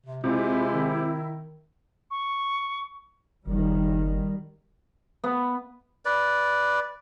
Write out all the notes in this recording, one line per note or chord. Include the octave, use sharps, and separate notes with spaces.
C3
C3 G#3 E4 F4
D#3
C#6
F#1 D#3 G3
B3
B4 D5